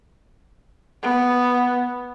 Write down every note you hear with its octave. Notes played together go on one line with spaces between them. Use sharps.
B3